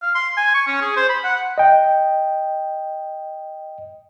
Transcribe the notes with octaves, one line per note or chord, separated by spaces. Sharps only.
F5
C6
G#5
C#6
C#4
G#4
C5
B5
F#5
D#5 G5